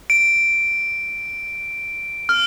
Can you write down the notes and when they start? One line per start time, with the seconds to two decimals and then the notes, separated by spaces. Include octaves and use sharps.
0.10 D7
2.29 F6